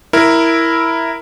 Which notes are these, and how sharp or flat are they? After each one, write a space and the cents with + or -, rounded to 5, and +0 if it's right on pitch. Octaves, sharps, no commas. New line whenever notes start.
E4 +0 A#4 +0